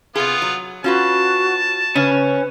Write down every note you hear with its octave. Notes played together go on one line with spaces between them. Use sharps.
C3 B3 F4 G#4
F#3
C#4 F4 F#4 B4 A5
C#3 C#4 B4